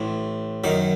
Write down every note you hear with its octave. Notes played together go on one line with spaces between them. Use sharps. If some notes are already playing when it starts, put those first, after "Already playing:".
Already playing: A1 A2
F#2 D#3 D#4